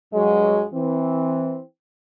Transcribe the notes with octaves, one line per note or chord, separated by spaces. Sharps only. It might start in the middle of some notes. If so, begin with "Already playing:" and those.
G2 F#3 G#3
E3 C4